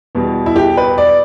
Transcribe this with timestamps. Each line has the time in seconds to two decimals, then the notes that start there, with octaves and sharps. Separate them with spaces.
0.15 E2 B2 G3
0.46 E4
0.56 G4
0.77 B4
0.98 D5